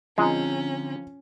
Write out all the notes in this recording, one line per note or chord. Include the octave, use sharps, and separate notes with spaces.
D3 F3 G#3 C4 C#4 D#4 A#5